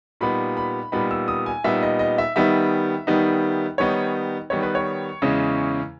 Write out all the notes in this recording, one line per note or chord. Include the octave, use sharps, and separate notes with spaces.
A#2 G3 B3 D#4 B5
B5
A#2 G3 B3 D#4 B5
E6
D#6
G#5
A#2 G3 B3 D#4 E5
D#5
D#5
E5
D#3 G3 B3 D#4 E5
D#3 G3 B3 D#4
D#3 G3 B3 D#4 C#5
D#3 G3 B3 D#4 C#5
B4
C#5
E2 C#3 G#3 C#4